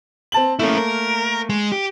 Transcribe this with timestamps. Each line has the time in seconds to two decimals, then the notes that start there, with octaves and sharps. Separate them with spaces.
0.32 C4 A5 F#7
0.59 A3 A#3 C#4 E4
0.77 A#4
1.50 G#3
1.72 G4